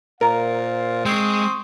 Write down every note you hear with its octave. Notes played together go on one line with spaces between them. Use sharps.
A#2 A#4 C5 F5
G#3 C4 C6 C#6 D#6